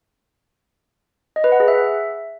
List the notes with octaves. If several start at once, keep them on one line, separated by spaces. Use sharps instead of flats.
D#5
B4
F#5
G#4
E5